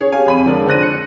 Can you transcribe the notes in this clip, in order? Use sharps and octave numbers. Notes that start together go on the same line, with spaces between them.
C#4 G#4 C#5
G4 F5 G#5
F2 B5 D#7
D3 F3 G#3 A#4 D5
D3 C5 F#6 A#6 D#7
F#6 C#7